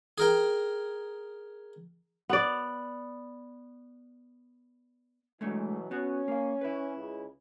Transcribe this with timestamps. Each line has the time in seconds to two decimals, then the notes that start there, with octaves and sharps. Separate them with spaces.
0.18 G#4 A#4 G5
2.29 B3 D5
5.41 B2 E3 F#3 G#3 A3 D4
5.91 B3 C#4 F#4
6.28 A#3 F5
6.61 E4 B4
6.96 C#2 C#3